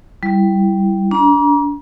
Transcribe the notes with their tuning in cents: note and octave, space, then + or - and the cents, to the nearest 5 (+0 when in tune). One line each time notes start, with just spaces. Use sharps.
G3 -10 E4 +0
D4 -30 A#5 +35